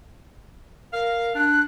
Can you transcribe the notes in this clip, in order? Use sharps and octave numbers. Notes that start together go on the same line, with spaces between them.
A#4 F5
D4 F#6